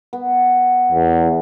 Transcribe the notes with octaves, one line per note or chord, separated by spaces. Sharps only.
B3
E2